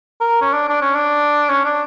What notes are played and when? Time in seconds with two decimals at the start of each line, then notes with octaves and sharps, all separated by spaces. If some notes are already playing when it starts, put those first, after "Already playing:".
0.21 A#4
0.41 C#4
0.53 D4
0.69 D4
0.82 C#4
0.95 D4
1.49 C#4
1.65 D4